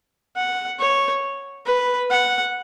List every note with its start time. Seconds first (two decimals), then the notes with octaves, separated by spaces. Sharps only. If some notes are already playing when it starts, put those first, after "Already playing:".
0.37 F#5
0.80 C#5
1.67 B4
2.10 F#5